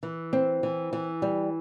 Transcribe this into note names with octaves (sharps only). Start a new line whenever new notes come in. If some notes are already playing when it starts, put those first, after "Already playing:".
E3
C4
E3
E3
G3